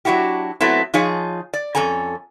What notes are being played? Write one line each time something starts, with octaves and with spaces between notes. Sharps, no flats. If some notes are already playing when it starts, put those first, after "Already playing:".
F#3 D4 E4 F#4 G4
F#3 A3 B3 C4 E4
F3 D#4 F4 G#4 C#5
D5
F2 C#4 A4 G#5 A#5